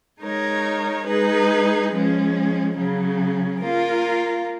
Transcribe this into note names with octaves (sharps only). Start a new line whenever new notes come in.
G#3 D#4 A#4 C#5
G#3 D#4 G#4 B4
F3 G#3 C#4
C#3 F#3 C#4
A#3 F4 A#4